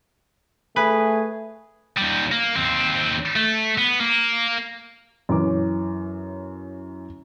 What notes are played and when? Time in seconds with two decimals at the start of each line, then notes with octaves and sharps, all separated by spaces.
0.76 A3 G#4 B4
1.98 D#2 G3
2.31 A#3
2.56 D#2 C4
3.36 A3
3.78 B3
4.00 A#3
5.29 F#2 E3 C#4 D6